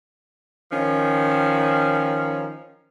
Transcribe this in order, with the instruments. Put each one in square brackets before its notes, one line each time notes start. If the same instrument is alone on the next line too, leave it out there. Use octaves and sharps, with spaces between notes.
[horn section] D#3 F3 C#4